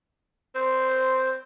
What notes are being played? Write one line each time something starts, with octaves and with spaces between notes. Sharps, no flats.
C4 C5